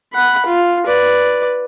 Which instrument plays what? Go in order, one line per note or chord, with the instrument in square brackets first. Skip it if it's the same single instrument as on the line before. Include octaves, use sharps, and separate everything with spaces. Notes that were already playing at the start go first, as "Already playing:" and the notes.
[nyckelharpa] F#5 B5
F4
B4 D5